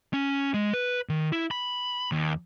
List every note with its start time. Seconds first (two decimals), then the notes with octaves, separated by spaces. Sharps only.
0.14 C#4
0.54 G#3
0.74 B4
1.09 D#3
1.32 E4
1.51 B5
2.12 D#2